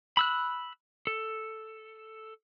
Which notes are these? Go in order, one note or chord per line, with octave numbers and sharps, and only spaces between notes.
B5 E6 F#6
A4